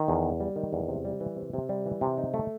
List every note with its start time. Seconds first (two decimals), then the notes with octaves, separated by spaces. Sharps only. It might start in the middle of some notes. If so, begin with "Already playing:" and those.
Already playing: D#3
0.08 E2
0.23 B3
0.40 G3
0.56 D#3
0.73 E2
0.88 C3
1.05 G3
1.20 E3
1.36 C3
1.54 C3
1.69 G3
1.86 E3
2.01 C3
2.18 D#4
2.34 A3